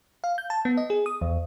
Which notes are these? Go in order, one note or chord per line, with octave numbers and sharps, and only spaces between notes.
F5
G6
A5
B3
D#5
G#4
D#6
E2